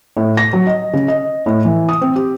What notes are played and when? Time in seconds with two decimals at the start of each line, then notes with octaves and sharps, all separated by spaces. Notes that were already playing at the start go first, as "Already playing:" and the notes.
0.17 A2
0.37 A#6
0.53 F#3
0.67 D#5
0.93 C#3
1.08 D#5
1.46 A2
1.65 E3
1.89 D#6
2.01 C4
2.16 G4